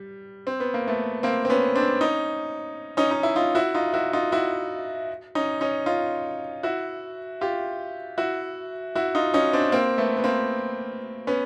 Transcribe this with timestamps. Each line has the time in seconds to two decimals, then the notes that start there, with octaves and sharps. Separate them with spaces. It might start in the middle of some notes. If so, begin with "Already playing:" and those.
Already playing: G3
0.47 C4
0.60 B3
0.74 A#3
0.87 A3 B3
1.23 A#3 C4
1.45 C4
1.50 B3 C#4
1.76 C4 D4
2.01 C#4 D#4
2.97 C#4 D#4
3.11 D#4
3.23 E4
3.36 D#4 F4
3.55 E4 F#4
3.75 D#4 F4
3.94 E4 F#4
4.13 D#4 F4
4.32 E4 F#4
5.35 C#4 D#4
5.61 C#4 D#4
5.86 D#4 F4
6.63 E4 F#4
7.41 F4 G4
8.18 E4 F#4
8.96 E4 F#4
9.15 D#4 F4
9.34 C#4 D#4
9.53 C4 D4
9.72 A#3 C4
9.98 A3 B3
10.17 B3
10.24 A#3 C4
11.27 B3 C#4